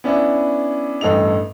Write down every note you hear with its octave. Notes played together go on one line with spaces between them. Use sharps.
B3 C#4 D4 E4
A1 G2 A4 D#5 F7